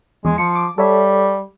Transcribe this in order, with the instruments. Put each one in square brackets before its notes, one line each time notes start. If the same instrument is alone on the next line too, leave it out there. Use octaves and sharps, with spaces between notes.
[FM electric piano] E2 [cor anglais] G#3
[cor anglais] F3 [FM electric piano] C#7
[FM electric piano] D6
[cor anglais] G3 [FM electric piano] A4 C#5 E5